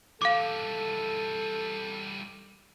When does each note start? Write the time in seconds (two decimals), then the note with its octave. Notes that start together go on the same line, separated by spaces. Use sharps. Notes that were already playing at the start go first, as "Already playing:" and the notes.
0.22 E3 G3 A4 F5 D6